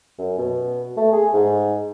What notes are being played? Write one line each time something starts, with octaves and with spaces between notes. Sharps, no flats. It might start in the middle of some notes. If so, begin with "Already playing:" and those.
F#2
B2
A3
G#4
G#2